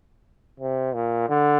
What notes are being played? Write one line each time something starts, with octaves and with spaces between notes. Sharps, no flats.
C3
A#2
D3